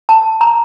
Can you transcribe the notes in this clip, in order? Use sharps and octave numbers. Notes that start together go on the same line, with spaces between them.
A5
A#5